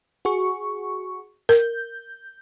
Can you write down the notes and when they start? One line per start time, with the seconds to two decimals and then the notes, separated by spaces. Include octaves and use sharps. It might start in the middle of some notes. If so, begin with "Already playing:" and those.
0.25 F#4 G#4 C#6
1.49 A#4 G6